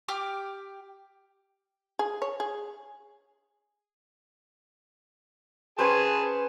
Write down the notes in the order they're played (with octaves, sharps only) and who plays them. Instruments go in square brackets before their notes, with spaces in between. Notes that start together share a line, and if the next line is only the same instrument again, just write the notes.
[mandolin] G4 G5 D6 F6
[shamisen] G#4
C#5
G#4
[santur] C#4 B4 C5 [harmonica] G#4 G#5 A5